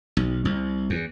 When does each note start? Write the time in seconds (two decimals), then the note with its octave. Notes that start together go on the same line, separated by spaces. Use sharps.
0.17 B1
0.45 C2
0.90 E2